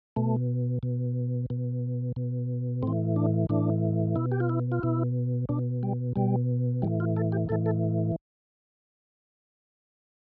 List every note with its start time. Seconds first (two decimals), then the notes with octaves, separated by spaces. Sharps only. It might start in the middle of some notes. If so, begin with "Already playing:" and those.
0.16 B2 A3
0.83 B2
1.50 B2
2.16 B2
2.83 A2 E3 C4
3.16 D4
3.49 A2 E3 D4
4.16 B2 E4
4.32 G4
4.40 F4
4.49 E4
4.72 F4
4.83 B2 E4
5.49 B2 D4
5.83 G3
6.16 B2 G3
6.82 A2 E3 G3
7.00 F4
7.17 A4
7.32 G4
7.49 A2 E3 A4
7.66 A4